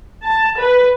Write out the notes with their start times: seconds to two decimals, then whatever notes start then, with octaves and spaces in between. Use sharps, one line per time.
0.22 A5
0.59 B4